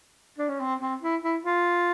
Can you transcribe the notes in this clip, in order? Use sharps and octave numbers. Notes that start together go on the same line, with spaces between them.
D4
C#4
C4
C4
E4
E4
F4